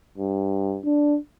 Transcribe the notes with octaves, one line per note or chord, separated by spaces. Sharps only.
G2
D4